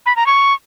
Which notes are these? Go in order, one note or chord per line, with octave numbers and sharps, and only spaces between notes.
B5
A#5
C#6